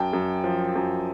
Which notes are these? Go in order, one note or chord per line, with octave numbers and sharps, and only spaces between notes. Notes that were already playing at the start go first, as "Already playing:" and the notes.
Already playing: F#2 G5 A5
F#2
F3
F#2